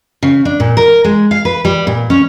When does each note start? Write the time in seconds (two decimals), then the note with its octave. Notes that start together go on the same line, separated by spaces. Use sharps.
0.23 C#3
0.45 D4
0.60 A#2
0.77 A#4
1.04 G#3
1.31 F5
1.45 B4
1.65 G3
1.87 A#2
2.10 C#4